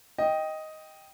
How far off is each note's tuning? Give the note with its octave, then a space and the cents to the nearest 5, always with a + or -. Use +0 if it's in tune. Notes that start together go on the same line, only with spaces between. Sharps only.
D#5 +5 G5 +0